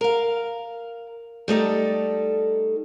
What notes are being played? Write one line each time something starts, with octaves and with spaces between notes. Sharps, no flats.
A#4 F5
G3 A3 D#4 A4